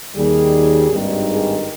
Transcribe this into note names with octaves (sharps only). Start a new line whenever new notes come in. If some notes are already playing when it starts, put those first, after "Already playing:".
D#2 D#3 G3 G#4
G#1 G2 D#3 G3
G#4